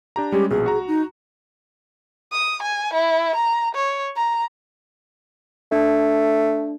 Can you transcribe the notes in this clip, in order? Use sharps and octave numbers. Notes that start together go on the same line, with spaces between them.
D4 G4 A#5
G3 G#3 C#4 G4
A#1 B2 G#4
F#4 A#5
D#4
D#6
G#5
E4
A#5
C#5
A#5
A3 D4